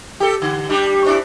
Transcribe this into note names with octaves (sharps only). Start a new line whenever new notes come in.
G4 A4
D3
G3 D4 G4
C4 D4 E4